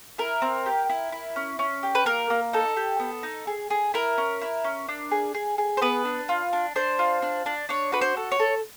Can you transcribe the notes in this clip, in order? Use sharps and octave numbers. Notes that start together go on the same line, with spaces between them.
E4 A#4
C4
G4
E4
E4
C#4
C#4
G4
B4
A#3 A#4
A#3
D#4 A4
G4
B3
D#4
G#4
G#4
E4 A#4
C#4
E4
C#4
D4
G#4
G#4
G#4
C5
B3 B4
D4
F4
D4
D4 C5
F4
D4
D4
D4 C#5
F#4 B4
C5
A4
C#5
A4